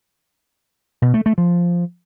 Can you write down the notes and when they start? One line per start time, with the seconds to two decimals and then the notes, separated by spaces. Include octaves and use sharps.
1.02 B2
1.14 A3
1.26 A3
1.38 F3